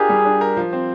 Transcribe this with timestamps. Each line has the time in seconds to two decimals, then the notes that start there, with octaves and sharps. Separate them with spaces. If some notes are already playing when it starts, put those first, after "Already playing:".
Already playing: D4 F4 G4 G#4 A#4
0.09 G3
0.25 D4
0.41 A#4
0.57 F3
0.73 C4